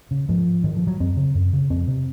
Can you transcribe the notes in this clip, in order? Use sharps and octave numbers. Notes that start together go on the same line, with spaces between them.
C#3
G#2 F3
G#2 D#3
F3
F#3
F#2 C4
C#3
F#2
C#3
F2 C4
C3